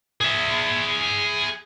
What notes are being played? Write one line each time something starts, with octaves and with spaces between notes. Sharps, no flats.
G#4 E5